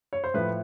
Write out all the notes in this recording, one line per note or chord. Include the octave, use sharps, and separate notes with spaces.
C#5
C5
A2 F3 B4